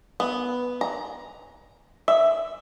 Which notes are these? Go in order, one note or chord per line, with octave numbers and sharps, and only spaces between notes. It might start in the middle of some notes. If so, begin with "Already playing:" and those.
B3
A#5
E5